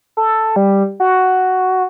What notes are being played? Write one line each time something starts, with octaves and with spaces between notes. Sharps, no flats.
A4
G3
F#4